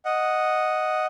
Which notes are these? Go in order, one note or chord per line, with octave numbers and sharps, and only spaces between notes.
D#5 F#5